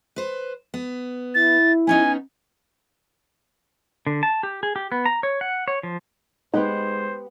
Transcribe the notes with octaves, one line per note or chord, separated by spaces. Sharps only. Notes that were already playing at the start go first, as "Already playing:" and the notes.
B4 C5
B3
E4 A6
B3 C#4 D#4 G#5
D3
A5
G4
G#4
G4
B3
A#5
C#5
F#5
C#5
F3
G#3 B3 D#4 G4 C5 F#5